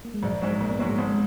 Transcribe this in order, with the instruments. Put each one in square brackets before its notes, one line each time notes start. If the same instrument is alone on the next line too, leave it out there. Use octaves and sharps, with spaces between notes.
[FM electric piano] A#3
G#3
[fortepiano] A#1 [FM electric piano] F#3
[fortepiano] G#2 F#3 [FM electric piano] G#3
[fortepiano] A#1 [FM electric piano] A#3
[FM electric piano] B3
[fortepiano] G#2 F#3 [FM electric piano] A#3
[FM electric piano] G#3
[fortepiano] G#1 [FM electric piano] B3
[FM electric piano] G#3